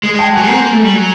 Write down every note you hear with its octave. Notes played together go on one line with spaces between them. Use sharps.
G#3
G#3 G5 A5
F#3 F#5 G#5
C4 G#5 A#5
A#3
A3
G3
F#3